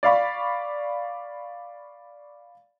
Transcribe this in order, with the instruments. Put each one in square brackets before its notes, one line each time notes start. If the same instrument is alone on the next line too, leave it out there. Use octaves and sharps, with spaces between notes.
[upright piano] D5 F5 B5 C#6